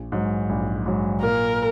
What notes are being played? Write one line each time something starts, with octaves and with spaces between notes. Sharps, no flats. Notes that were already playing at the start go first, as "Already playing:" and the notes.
Already playing: A#1
G#2 F#3
A#1
G#2 F#3
A#2 A#4